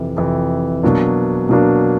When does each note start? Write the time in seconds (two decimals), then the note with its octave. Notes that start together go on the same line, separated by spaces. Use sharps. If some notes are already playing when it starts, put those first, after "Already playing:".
Already playing: F2 C3 E3
0.17 F2 C3 E3
0.83 B2 F#3 A#3 D4
1.49 B2 F#3 A#3 D4